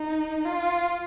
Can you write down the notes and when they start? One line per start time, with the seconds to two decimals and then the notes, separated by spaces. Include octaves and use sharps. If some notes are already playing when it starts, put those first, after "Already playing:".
Already playing: D#4
0.45 F4